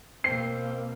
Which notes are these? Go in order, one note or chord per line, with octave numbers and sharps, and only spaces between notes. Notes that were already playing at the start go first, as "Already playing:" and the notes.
B2 A#3 C4 C7